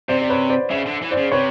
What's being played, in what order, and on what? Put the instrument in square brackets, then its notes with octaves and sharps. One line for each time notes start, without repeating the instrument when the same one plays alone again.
[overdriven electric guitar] C3 [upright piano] C5 D5
[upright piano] D5
B4 C#5
C5 D5
[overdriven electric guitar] C#3 [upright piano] D5 E5
[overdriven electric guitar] D3
E3
[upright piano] C5 D5
[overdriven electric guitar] C#3
[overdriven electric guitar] C3 [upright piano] B4 C#5